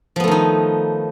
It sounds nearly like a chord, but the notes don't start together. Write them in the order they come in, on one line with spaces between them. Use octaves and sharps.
F3 B3 A3 D#3 D#4